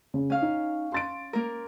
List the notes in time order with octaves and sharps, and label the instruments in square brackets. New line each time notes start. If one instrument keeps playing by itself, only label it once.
[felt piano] C#3
[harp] C#4 F5
[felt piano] D#4
C6 A6 D7
[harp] A#3 A#4